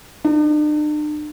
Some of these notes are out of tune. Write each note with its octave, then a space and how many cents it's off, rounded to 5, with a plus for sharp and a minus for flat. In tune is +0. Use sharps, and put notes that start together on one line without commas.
D4 +45